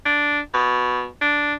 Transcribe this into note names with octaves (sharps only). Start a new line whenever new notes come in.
D4
B2
D4